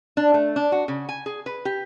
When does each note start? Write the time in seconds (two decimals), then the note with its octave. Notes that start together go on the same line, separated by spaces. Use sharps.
0.17 D4
0.34 A3
0.56 D4
0.72 F#4
0.88 C#3
1.09 G#5
1.26 G#4
1.46 B4
1.65 G4